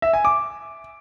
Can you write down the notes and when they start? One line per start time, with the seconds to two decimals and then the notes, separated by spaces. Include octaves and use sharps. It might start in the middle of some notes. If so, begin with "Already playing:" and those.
0.02 E5
0.13 G#5
0.25 D6